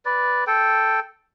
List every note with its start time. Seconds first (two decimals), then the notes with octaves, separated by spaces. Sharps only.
0.05 B4 D5
0.47 A4 G5